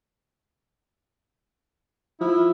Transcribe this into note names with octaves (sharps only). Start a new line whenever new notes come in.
F3 E4